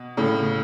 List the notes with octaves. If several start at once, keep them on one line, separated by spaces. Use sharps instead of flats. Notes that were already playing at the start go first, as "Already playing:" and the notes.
Already playing: B2
A2 C#3